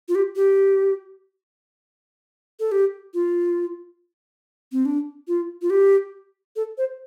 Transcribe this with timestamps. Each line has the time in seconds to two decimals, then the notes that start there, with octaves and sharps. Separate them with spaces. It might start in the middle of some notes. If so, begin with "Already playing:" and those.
0.08 F4
0.15 G4
0.36 G4
2.60 A4
2.72 G4
3.14 F4
4.72 C4
4.85 D4
5.28 F4
5.62 F4
5.70 G4
6.56 A4
6.78 C5